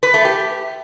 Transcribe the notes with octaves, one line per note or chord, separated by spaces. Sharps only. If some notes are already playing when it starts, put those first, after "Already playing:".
B4
A3
G4